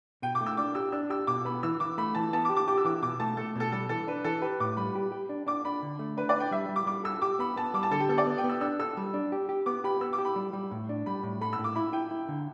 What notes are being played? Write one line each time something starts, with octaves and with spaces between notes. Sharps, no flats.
B2 G5
D6
A3
E6
D4 D6
G4 E6
D4 E6
G4 E6
B2 D6
B3 B5
E3 E6
E3 D6
A3 B5
E3 A5
B3 A5
D6
G4
D6
G4 D6
E6
E3 D6
B2 D6
A3 A5
A3 A4
B2 A4
G3 A4
E3 A4
D4 B4
E3 A4
G4 B4
A2 D6
G3 B5
G4
G4
D4
D4 D6
D4 B5
D3
A3
D4 B4
D5
D4
G5
G3 E5
G3
D6
G3 D6
A4 E6
G4 D6
B3 B5
B3 A5
G3 D6
A5
D3 A4
G4
B3 A4
D5
B3
G5
B3
E6
D4 E6
A4 E6
G3
D4
G4
G4
B3 D6
G4 B5
B3 E6
D6
G4
B5
G3
G3
A2
D4
G3 B5
A2
A4 B5
E6
A2
D6
E4 B5
E4 G5
E4
D3